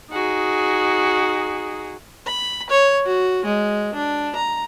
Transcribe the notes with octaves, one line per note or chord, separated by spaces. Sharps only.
D#4 F#4 G#4
B5
C#5
F#4
G#3
D4
A#5